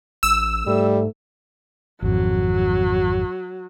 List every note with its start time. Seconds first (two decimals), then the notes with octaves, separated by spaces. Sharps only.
0.23 A1 E6
0.67 G#2 G3 A3
2.02 G#1 F2 F#3